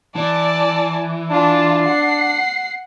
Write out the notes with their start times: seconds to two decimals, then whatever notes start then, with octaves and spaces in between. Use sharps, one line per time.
0.16 E3 D5 A5
1.31 D4 F4 A5
1.84 F#5 C7